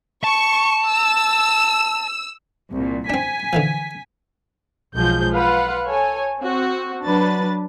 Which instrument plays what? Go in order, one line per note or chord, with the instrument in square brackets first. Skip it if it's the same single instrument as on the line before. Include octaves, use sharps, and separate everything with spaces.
[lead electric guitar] A5 [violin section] C#6
[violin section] E6
[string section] C2 A#2
[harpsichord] C4 D4 [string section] G#5 B6
[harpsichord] D3 E3 F3
[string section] B1 F3 F#3 G#3 G6
F4 B4 F5 F#5
A4 C#5 G#5
C4 F#4
F#3 D4 B4 A6